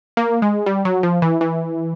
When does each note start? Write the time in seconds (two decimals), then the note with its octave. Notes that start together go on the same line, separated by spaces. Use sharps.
0.17 A#3
0.42 G#3
0.66 G3
0.85 F#3
1.03 F3
1.22 E3
1.41 E3